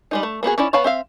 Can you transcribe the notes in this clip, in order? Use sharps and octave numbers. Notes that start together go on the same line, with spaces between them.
G3 G#3 D#4
A3
A#3 B3 F#4 G#4
C#4 D#4 E4 D5
B3 C#5 F5 A5 B5
C4 E5 F5